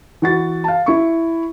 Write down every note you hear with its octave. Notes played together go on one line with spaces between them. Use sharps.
E3 F#4 A6
F5 A5
E4 C#6